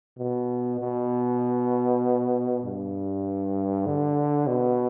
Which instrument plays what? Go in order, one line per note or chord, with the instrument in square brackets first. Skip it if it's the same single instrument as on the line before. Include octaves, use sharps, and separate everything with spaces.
[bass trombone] B2
B2
G2
D3
B2